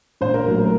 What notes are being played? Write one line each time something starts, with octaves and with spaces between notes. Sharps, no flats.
A#1 C5
A#4
A2 F#3 A#3 A#4
A#4